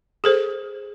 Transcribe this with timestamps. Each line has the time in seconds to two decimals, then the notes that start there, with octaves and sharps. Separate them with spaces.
0.24 G#4 A4 C5